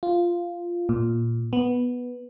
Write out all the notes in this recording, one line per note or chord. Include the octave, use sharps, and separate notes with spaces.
F4
A#2
B3